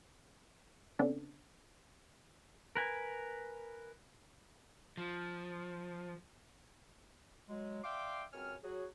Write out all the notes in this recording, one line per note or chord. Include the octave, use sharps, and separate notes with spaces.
C#3 B3 C4 D4 A4
A#4 B4 G#5
F3
F#3 G#3
D5 E5 F5 G5 C6 D6
C#2 F#2 C4 C#5 G#5 F6
F#3 F#4 G#4